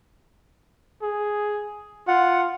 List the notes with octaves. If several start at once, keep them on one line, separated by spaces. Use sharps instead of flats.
G#4
F4 F#5